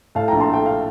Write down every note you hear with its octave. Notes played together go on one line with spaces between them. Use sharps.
A2 F5 A5
G5 A#5
A#1
A5 C6
A3 G5
F5